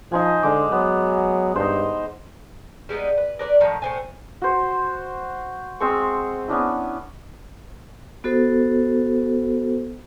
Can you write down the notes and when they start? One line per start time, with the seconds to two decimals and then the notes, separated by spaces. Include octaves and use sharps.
0.12 F3 D#4 C5 G#5
0.43 D3 G#3 D6
0.72 F#3 B3
1.56 G2 D#4 C5
2.89 G3 G#3 B3 D#4
3.18 B4
3.39 A#4 B4 C#5 D5
3.60 A2 D#3 F3 A#5
3.82 A2 C5 G#5
4.42 F#4 C5
5.80 G#3 C4 C5 C#6
6.48 B3 C#4 D4 E4
8.24 B3 F#4 A4 C5